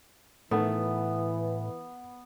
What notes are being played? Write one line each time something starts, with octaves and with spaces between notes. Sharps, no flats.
A2 D#3 E3 A3 B3